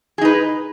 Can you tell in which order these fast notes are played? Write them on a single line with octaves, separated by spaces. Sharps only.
G#4 D#4 B4